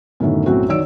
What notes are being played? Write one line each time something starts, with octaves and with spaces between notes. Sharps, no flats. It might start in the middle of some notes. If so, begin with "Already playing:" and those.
F#2 A2 D3 D#3 B3
B1 F#2 A2 C4 E4 F#4
D#3 F#3 C#5 D5 E6 D7